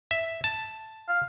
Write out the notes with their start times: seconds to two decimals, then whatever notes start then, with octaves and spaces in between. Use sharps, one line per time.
0.11 E5
0.44 A5
1.08 F5